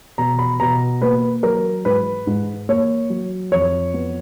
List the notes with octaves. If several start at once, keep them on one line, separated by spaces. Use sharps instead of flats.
B2 A#5
B5
B2 A#5
A#3 B4
F#3 A#4
G#2 B4
G#2
A#3 C#5
F#3
F2 C#5
B3